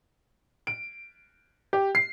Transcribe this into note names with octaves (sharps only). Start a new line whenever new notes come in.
D7
G4
C7